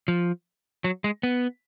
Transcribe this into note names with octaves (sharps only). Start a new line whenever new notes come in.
F3
F#3
G#3
B3